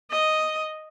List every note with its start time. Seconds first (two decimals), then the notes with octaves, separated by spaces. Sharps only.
0.11 D#5